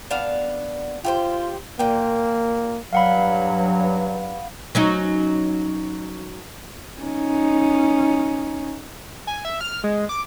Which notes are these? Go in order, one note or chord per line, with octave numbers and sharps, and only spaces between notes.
B3 D4 F5
F4 G4 G#4 C5
A#2 A#3 G5
G2 F#3 F5 F#5 B5
F#3 C#4 D#4
C#4 D#4
G#5
E5
F6
G#3
D6